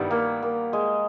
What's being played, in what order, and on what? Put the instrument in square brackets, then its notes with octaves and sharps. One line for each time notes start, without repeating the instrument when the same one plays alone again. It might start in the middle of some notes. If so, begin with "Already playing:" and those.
Already playing: [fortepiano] G2 D#3 G3 B3 E4
[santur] A#3
A#3
G#3